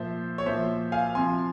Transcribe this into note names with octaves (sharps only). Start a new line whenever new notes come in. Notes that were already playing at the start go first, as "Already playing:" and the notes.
Already playing: A#2 F3 C5 E5
C#5
A#2 F3 C5 E5
F5 G#5
C3 F3 G#5 C6